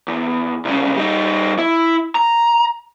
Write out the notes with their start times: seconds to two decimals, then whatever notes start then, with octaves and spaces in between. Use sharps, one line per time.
0.08 E2
0.65 C2 C#3
0.96 G3 D#4
1.59 E4
2.15 A#5